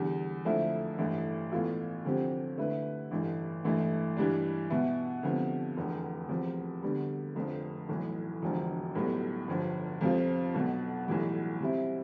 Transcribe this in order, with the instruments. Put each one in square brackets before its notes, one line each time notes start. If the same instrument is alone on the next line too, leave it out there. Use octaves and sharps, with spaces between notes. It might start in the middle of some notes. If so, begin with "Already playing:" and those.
Already playing: [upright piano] E2 D3 G3
F2 D3 F3 A3 E4
A1 G2 E3 A3
A2 E3 B3 F4 A4
D2 C3 F3 C4 G4
D3 A3 E4 B4
A1 G2 E3 A3
A1 G2 E3 A3
G2 E3 G3 D4
B2 B3 E4
D2 C3 F3 B3
F1 E2 D3
E2 C3 F3
D2 D3 G3 B3
F1 F2 D3 F3
B1 A2 E3
E1 E2 D3 F3
B1 A2 G3 B3
G1 G2 F3
F2 C3 F3 C4 F4
B1 B2 B3
B1 A2 E3 G3
C3 G3 C4 E4